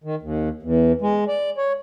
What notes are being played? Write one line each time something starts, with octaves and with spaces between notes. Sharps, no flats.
D#3
D#2
E2
G#3
D5
C#5